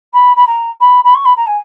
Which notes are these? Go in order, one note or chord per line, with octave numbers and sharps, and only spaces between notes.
B5
B5
A#5
B5
B5
C#6
B5
A#5
G#5